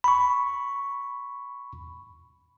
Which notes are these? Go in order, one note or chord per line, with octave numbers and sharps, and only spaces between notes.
B5 C#6